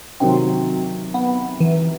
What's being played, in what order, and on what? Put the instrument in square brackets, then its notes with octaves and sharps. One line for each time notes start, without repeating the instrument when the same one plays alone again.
[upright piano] C3 D#3 F#3 [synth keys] C4
[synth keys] B3
E3